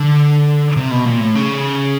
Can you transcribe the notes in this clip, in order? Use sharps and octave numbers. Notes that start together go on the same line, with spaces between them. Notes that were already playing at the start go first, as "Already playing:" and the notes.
Already playing: D3
C3
B2
A#2
A2
C#3